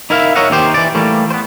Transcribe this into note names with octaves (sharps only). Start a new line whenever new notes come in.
D#4 E4 A#4 E5 F5
A#4 C#5 D#5 E5 F#5
D#2 D#3 G4 C5
E3 D5
E3 G3 A3 A#3
B3 C5